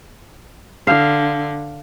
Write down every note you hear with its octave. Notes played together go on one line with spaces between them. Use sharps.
D3 F5